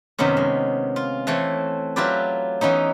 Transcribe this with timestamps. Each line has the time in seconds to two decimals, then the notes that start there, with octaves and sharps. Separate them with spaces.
0.18 F#2 C3 D#3 B3 C#4
0.37 G#3
0.96 F4
1.27 E3 A3 C4 C#5
1.96 F#3 E4 F4 G4 B4 D5
2.61 E3 B3 C#4 D#4